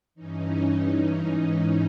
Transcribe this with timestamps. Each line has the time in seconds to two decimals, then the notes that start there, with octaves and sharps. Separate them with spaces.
0.15 G2 E3 C#4 D#4
1.20 G#2 E3